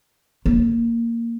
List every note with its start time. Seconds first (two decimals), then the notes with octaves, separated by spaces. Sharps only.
0.46 A#3